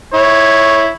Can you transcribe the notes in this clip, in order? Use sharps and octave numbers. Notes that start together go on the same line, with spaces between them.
E4 C#5